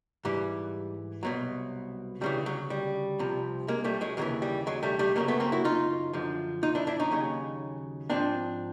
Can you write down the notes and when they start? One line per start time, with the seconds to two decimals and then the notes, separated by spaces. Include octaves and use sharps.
0.25 G#2 E3 G3
1.23 C2 B2 F#3
2.21 D2 C#3 E3 G3
2.46 F#3
2.70 G3
3.19 C2 C3 F3
3.68 G#3 A#3
3.84 G3 A3
4.01 F#3 G#3
4.17 D#2 C#3 E3 F#3
4.42 G3
4.67 F#3 G#3
4.83 G3 A3
4.99 G3 A3
5.16 F#2 C#3 F#3 G#3 A#3
5.28 A3 B3
5.40 A#3 C4
5.52 E4 F#4
5.65 D#4 F4
6.13 F#2 D3 F3
6.63 D#4 F4
6.75 D4 E4
6.87 D4 E4
7.00 C#4 D#4
7.11 D#2 C#3 F#3
8.10 G#2 F3 C4 D4